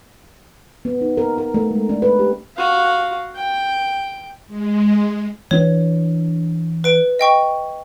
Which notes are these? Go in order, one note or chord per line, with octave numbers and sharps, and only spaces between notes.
B3
D#4
A#4
A#4
A3
G#3
D4
B4
G4
F#4 F5
G5
G#3
E3 D4 C#5
B4 D7
D#5 G5 C#6